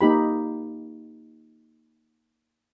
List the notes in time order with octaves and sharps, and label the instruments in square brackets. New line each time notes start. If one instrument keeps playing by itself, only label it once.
[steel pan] A#3 D#4 G4 B5